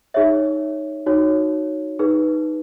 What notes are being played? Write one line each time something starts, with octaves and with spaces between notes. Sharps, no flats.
D#4 G#4 C#5 E5
D#4 F#4 C#5
D#4 G#4 B4